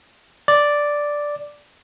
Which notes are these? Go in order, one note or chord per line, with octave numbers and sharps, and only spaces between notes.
D5